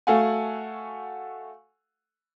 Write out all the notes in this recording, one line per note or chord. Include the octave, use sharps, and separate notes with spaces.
A3 F#4 A4 F5 F#5 G#5